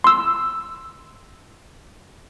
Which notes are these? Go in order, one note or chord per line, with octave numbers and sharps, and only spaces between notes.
C6 E6